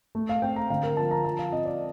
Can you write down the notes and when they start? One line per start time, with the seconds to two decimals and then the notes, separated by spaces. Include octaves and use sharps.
0.15 A3
0.29 F5
0.42 C4 G5
0.56 A#5
0.70 D3 F5
0.83 A#4
0.97 F3 A5
1.11 A#5
1.25 F3 A5
1.39 F5
1.52 C4 D#5
1.65 D5